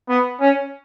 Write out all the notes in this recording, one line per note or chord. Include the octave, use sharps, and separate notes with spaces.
B3
C#4